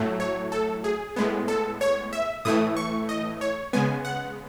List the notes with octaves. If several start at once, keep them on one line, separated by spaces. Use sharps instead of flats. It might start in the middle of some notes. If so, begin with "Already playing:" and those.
Already playing: A2 F#3 A3
C#5
A4
G#4
A2 G#3 B3
A4
C#5
E5
A2 E3 A3 D#6
C#6
D#5
C#5
C#3 G#3 B3 G#5
F#5